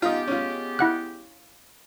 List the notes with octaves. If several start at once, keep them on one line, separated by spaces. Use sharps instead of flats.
G#3 B3 D#4 F4 G4
C#4 F4
E4 F#5 F#6